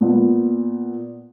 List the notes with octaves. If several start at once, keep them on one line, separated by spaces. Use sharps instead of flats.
A#2 B3